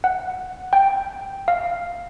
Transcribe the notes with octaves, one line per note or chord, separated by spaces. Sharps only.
F#5
G5
F5